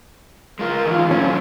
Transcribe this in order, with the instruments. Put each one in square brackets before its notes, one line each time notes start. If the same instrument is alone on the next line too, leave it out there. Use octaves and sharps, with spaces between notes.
[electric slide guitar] G#3 F4 [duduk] A#4
[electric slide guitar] G#2 D#3 E3 [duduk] F4
[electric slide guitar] D3 F#3 E4 [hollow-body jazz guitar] C#4